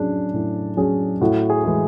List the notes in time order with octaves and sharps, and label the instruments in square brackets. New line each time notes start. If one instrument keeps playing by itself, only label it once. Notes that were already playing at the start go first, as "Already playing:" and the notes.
Already playing: [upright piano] A2 F#3 C#4 G#4 [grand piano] D4
[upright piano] A2
F#3 C#4 G#4
[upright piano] A2 [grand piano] F#4
[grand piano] G#4
[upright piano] E3 G#3